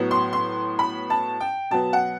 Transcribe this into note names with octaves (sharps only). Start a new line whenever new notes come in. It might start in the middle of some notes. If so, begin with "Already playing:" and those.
Already playing: A2 F#3 B3
C6
C6
B5
A5
G5
B2 F#3 B3 A5
F#5